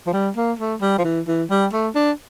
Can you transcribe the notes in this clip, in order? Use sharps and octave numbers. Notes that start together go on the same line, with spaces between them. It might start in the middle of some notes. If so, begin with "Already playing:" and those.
F3
G3
A#3
A3
G3
F3
E3
E3
G3
A3
D4